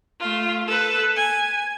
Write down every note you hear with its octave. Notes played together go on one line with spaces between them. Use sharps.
A3 F4
A4 B4
G#5